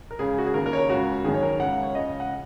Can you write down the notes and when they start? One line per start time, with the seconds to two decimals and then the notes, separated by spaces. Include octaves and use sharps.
0.11 A#4
0.19 C#2 C#3 G#4
0.38 F#4
0.47 G#4
0.54 D#2 C#3 A#4
0.66 A#4
0.73 C#5
0.78 A#4
0.89 C#2 C#3 F#4
1.24 D#3 G#4
1.29 F#2
1.34 C#5
1.43 A#4
1.60 C#2 C#3 F#5
1.83 C#5
1.95 C#2 C#3 D#5
2.20 F#5